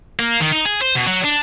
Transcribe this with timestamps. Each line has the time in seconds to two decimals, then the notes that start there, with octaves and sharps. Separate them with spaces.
0.19 A#3
0.40 D#3
0.52 D#4
0.65 G#4
0.81 C5
0.95 B2
1.07 F#3
1.24 D4